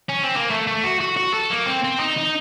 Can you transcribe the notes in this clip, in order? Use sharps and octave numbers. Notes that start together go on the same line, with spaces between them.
C#4
C4
A#3
A3
A3
F#4
F#4
F#4
A4
A#3
C4
C4
D#4
D#4